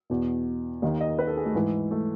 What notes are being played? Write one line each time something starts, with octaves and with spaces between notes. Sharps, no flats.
E2 B2
D#2 D#3 D#5
D#5
B4
A4
G#4
A3
G#2 E3
A3